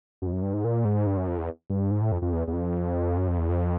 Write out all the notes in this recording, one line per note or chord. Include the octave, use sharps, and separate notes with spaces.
F#2
F2
F#2
G2
G#2
A#2
G#2
G2
F#2
F2
E2
G2
G#2
A2
F2
F2
E2
E2
F2
F#2
F2
E2
F2